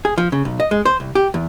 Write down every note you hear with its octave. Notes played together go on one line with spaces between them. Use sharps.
G#4
F3
C#3
B1
D#5
G#3
C5
C2
G4
E2